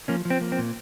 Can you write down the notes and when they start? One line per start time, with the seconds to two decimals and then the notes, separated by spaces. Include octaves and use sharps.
0.08 F3 A#3 C#4
0.25 F3
0.30 C4
0.41 A#3
0.52 C4
0.58 A#2